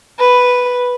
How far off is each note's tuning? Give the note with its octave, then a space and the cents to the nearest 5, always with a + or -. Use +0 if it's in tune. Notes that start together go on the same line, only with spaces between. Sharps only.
B4 +0